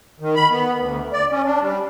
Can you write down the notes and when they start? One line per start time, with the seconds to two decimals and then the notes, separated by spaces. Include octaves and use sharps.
0.20 D#3
0.36 B5
0.50 B3
0.78 D2
1.12 D5
1.31 C#4
1.45 D4
1.61 G3